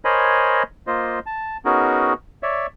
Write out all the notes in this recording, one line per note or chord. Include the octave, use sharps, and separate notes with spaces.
A#4 C5 C#5 D#5 G#5 B5
A#3 F4 C5 D#5
A5
B3 C#4 D#4 F#4 G#4 A#4
C#5 D5 E5